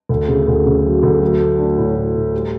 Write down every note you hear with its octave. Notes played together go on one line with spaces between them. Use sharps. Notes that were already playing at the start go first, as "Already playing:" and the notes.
D2
C#3
D2
C#3
F#3
D2
F#3
A3
D4
A2
A2
A2
G3